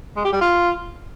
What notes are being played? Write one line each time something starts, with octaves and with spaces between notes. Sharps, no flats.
G#3
G4
G3
F4